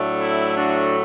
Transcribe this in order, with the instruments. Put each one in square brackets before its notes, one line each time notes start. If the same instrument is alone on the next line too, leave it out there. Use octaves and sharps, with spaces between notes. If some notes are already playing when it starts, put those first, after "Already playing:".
Already playing: [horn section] A2 F#3 A3 D4
E4
D4 F#4